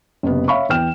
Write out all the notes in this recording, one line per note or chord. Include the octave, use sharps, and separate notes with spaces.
F#1 C3 B3
C#5 E5 F5 B5 C#6
E2 E3 G5 F6 E7